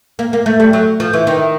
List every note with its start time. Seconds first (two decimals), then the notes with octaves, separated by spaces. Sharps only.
0.19 A#3
0.33 A#3
0.46 A3
0.60 G3
0.73 F#3
1.00 F3
1.13 E3
1.27 D#3